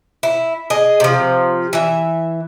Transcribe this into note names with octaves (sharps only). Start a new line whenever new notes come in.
E4
G#4 D#5
C3 F3
E3 E5